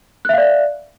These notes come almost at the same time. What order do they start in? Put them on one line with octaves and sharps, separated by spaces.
F#6 E5 F5 D5